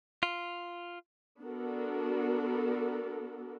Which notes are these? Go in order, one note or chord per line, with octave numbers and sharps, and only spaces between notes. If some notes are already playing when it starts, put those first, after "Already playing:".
F4
B3 D4 F#4 A4 A#4